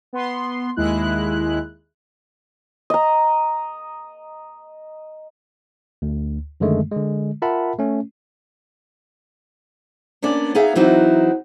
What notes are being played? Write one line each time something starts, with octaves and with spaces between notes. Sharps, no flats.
B3 C6
D#2 G#3 E4 F#6
D#5 A#5
D2
F#2 D3 D#3 G#3 A3
D3 G#3
F4 A#4 E5 F#5 A5 B5
A3 C#4
A#3 B3 C#4 D4 D5
B3 D#4 G#4 E5 F5
E3 F#3 C4 D#4 E4 F#4